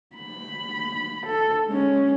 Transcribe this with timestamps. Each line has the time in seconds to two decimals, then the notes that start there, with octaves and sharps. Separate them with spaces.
0.17 B5
1.26 A4
1.67 G#3 C#4